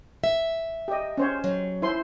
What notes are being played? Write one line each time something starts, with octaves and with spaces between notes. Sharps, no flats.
E5
G4 D#5
C#4 C5 C#5
F#3
E4 C5 C6